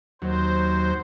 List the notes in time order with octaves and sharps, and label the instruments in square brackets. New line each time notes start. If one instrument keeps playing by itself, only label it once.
[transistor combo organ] D#2 F#3 [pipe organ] C5